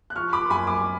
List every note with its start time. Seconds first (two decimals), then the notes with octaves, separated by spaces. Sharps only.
0.10 F#6
0.16 F3 C#6 F6
0.33 B5 D6
0.50 F#2 G#5 B5
0.67 B5 D6